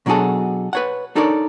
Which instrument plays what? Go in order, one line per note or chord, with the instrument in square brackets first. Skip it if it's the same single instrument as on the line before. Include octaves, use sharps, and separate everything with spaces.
[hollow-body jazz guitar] B2 F#3 D4 F#4 G#4 A4
B4 C#5 F#5
D4 D#4 A4 A#4 C#5 D5